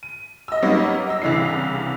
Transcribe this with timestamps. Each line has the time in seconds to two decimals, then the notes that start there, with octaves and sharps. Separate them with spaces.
0.03 D#7
0.48 D#5 E6
0.62 F#3 G3 A#3 B3 C#4 D#4
1.07 D#5 E6
1.22 C2 C#3 E3 D4 C7